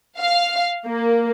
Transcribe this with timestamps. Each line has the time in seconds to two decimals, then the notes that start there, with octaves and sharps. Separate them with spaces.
0.18 F5
0.86 A#3